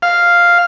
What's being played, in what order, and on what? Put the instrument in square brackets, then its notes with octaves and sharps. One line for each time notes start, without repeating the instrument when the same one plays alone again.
[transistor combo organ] F5